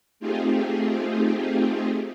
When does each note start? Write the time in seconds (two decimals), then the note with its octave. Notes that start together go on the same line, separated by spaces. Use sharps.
0.20 A3 C4 D#4 F4 G4 G#4